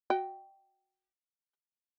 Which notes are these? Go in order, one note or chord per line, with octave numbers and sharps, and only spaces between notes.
F#4 D#5 G5